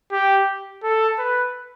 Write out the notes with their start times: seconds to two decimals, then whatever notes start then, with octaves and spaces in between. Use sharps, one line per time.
0.12 G4
0.83 A4
1.19 B4